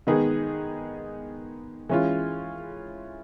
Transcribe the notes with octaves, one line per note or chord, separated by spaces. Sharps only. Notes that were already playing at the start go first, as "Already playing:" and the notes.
D#3 G#3 B3 D#4 G#4
E3 G#3 C#4 F4